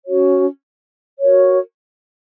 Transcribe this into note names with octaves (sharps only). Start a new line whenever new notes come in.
C#4 F#4 C#5
F#4 A#4 C#5